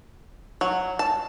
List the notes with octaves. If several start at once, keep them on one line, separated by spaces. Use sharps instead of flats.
F#3
A5